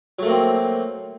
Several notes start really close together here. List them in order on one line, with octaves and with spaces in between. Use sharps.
F#3 A3 A#3 C4